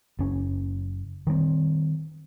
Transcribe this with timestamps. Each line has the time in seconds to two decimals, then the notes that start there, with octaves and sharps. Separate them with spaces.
0.19 F#1 C#4
1.27 D#3 G3 A#3 C4